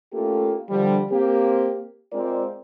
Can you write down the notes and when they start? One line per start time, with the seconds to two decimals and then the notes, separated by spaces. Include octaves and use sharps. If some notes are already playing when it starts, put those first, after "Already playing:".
0.13 A3 A#3 C#4 F4 G4 A4
0.70 D3 F3 G3
1.11 A#3 C4 G4
2.13 G#3 C4 F4 A#4 D5